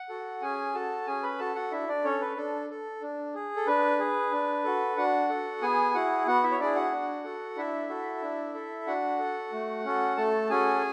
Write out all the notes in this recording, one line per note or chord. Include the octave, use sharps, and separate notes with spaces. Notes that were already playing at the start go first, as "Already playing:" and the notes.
Already playing: F#5
F#4 A4
C#4 G#4 G#5
F#4 A4 A5
C#4 G#4 G#5
B4 B5
F#4 A4 A5
F#4 F#5
D4 E4 E5
D4 D5
C#4 A4 C#5
B4
D4 A4
A4
D4
G#4
A4
D4 B4
G#4
D4
F#4 A4
D4 F#4 F#5
F#4 A4
B3 G#4 G#5
E4 F#4 G#4 F#5
B3 F#4 F#5
E4 E5
C#5
D4 E4 G#4 D5
F#4 F#5
D4
F#4 A4
D4 E4 E5
F#4 A4
D4
A4
D4 F#4 F#5
A4
A3
C#4 F#4 A4
A3 A4 A5
C#4 F#4 G#4 A4 G#5